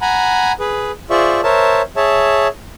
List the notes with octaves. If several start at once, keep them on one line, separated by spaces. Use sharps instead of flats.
F#5 G#5 A#5 B5
G#4 B4
F4 G#4 C5 D5 E5 C#6
A#4 C5 C#5 E5 A5
G#4 C#5 E5 A5